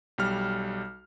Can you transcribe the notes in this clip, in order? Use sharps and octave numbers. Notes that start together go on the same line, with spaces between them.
B1 G3 F6